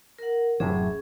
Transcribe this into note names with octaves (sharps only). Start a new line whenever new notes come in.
A#4 F#5
D#1 F#2 A2 C3 C#4 G#4